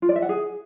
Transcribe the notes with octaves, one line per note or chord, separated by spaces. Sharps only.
F4
D5
E5
F#5
G#4